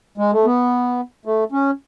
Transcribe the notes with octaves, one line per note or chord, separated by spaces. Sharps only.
G#3
A3
B3
A3
C#4